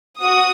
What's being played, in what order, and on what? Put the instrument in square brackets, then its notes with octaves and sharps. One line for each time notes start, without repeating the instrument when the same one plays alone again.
[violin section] F#4 D#6